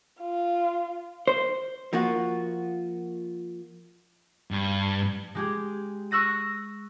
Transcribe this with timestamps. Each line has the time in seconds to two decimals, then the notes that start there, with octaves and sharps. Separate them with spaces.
0.21 F4
1.28 C5
1.93 F3 A#3 F4 F#4
4.51 G2
5.35 G#3 G4 G#4
6.11 C#6 E6 F#6 A#6 D#7